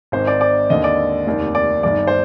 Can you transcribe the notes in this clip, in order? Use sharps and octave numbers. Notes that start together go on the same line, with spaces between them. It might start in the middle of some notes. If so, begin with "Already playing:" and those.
G#1 G#2 D#3 C5
D5
D5
D#2 D3 D#5
D5
F1 D#2 D#3
D5
G1 G2 D#3 D5
C5